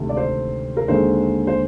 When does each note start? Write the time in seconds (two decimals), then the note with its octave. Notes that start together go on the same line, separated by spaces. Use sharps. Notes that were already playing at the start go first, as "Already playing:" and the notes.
Already playing: D2 C3 D#3 G#3
0.09 D5
0.17 C5
0.77 A#4
0.88 D#2 D3 G#3 C5
1.47 C5